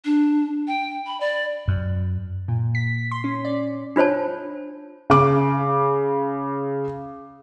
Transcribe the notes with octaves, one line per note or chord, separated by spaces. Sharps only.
D4
G5
B5
D5
F#2
A#2
B6
C6
C#4
D5
D4 F4 C5 C#5 A5
C#3 D6